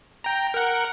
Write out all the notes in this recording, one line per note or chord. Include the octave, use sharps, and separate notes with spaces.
G5 A#5
A#4 F#5